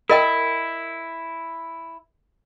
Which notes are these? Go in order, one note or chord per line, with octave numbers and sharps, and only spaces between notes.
E4 A#4 D#5 G5